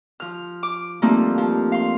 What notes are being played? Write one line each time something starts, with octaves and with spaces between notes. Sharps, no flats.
F3 F6
D6
F3 G3 A3 A#3 C4 D#4
F3
F5 C6